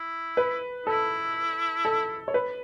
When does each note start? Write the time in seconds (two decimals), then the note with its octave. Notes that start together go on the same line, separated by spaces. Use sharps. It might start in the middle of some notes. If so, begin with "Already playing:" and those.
Already playing: E4
0.37 B4
0.86 E4 A4
1.85 A4
2.28 C#5
2.34 B4